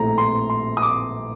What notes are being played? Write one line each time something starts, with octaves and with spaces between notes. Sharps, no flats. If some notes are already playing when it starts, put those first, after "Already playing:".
Already playing: A#1 A2 F3 A3 A#5
C6
C6
D#6
D6